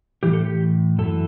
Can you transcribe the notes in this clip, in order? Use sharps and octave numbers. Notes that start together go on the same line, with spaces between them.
A2 E3 G4
A4
G4
F#2 E3 A4